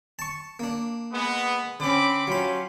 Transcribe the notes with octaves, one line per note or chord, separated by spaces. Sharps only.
A5 C#6
A#3 D4
G#3 B3
D3 C4 C#4 B5 D6
F#3 C#4 F4 G4 B5